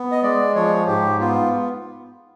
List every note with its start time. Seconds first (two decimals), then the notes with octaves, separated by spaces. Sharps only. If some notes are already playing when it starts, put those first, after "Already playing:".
Already playing: B3
0.12 D#5
0.23 G#3 D5
0.55 F3 C#5
0.87 G#2 G4
1.19 B3 F4